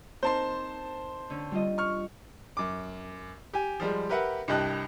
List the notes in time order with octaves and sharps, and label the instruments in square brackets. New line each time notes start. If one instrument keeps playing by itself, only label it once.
[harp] C4 D#4 A#4 [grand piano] C5 A5 C6
[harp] D3 C#4
G3 F4 D#5
[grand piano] C#6 F6
[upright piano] F#2 D6
G4 G#5
F3 G3 G#3
G4 A#4 B4 E5 F#5
C2 G2 G4 D#5 A5 F#6